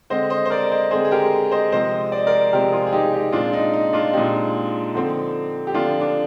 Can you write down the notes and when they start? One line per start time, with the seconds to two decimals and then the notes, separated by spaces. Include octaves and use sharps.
0.10 D3 G#3 C4 C5 D#5
0.30 C5 D#5
0.46 C5
0.50 A#4 D5
0.72 C5 D#5
0.91 D3 G#3 C4 G#4 C5
1.05 G#4
1.11 G4 A#4
1.51 C5 D#5
1.72 C3 F3 G#3 C4 C5 D#5
2.12 D5
2.19 D#5
2.27 A#4 D5
2.53 C3 F3 G#3 C4 G4 A#4
2.72 F4 G#4
2.87 G#4
2.93 D#4 G4
3.13 D#4 G4
3.32 A#2 G#3 C4 D4 F4
3.53 D#4
3.73 D#4
3.93 D4 F4
4.13 A#2 G#3 C4 D#4 G4
4.95 D3 F3 C4
5.67 G4
5.74 D3 F3 C4 D4 F4
6.01 D4